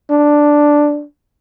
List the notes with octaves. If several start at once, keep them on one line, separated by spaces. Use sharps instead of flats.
D4